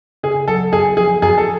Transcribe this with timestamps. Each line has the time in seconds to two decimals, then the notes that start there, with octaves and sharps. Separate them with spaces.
0.23 C#3 G#4
0.48 F#3 A4
0.73 F#2 G#4
0.97 F3 G#4
1.22 F#2 G#4
1.38 A4